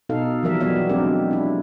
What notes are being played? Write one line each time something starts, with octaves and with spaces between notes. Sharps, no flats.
B2 D#4 A4 F5
E3 F3 G3 A#4 E5
F#3 G3 B3 C#5 E5
F#3 G#3 C4 D4 G4 A#4
D4 E4